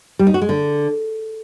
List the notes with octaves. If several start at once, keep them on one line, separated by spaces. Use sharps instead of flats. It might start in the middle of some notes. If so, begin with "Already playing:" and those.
G3
D#4
F#4
G#3
D3